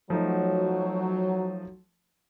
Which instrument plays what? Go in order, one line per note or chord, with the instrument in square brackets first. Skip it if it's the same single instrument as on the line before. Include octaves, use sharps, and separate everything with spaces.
[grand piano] F3 A3 D#4 [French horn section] F#3